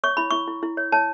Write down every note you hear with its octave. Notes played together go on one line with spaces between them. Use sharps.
C#5 C#6
E4 B5
E4 C#6
E4
E4
C#5
C#5 A5